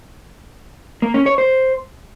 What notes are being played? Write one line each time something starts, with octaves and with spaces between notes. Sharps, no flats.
A#3
C#4
C#5
C5